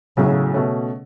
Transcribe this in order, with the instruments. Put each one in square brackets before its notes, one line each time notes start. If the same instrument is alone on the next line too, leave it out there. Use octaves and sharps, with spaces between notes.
[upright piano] B1 A2 F#3 [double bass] C#3
[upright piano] B2 A3 C#4